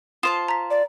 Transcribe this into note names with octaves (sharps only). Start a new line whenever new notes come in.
F4 C5 A5 D#6 E7
A#5 B6
D5